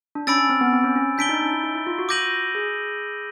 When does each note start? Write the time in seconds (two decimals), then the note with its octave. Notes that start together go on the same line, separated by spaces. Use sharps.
0.15 D4
0.27 C#4 B5 E6 A6 D7
0.38 C#4
0.49 C4
0.61 B3
0.73 C4
0.84 C#4
0.96 C#4
1.18 D4 G6 B6 D7 G7
1.29 D#4
1.41 C#4
1.53 E4
1.64 D#4
1.75 E4
1.87 F4
1.98 F#4
2.09 D6 G6 A#6 D#7 F#7
2.55 G#4